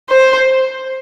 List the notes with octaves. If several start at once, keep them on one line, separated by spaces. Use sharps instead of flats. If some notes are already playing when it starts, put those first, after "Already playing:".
C5